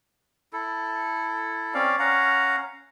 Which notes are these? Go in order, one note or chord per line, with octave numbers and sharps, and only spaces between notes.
E4 A4
C4 C#4 D5 F5
C#4 F5 F#5 A#5